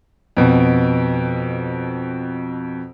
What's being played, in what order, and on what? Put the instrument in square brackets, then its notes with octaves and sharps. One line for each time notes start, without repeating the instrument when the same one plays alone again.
[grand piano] F2 B2